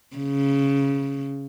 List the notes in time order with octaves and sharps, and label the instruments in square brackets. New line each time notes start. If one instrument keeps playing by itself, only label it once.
[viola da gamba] C#3